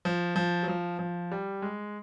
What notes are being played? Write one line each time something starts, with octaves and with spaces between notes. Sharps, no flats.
F3
F3
F#3
F3
F3
G3
G#3